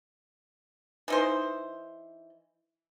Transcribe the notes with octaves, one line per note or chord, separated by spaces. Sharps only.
E3 D#4 C5